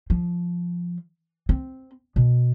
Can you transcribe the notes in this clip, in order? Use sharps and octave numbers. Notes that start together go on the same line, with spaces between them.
F3
C4
B2